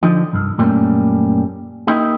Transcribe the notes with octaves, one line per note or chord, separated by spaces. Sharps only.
D3 F3 D#4
C2 G2
F#2 A#2 G3 A3 A#3 C#4
A#3 D#4 E4 G4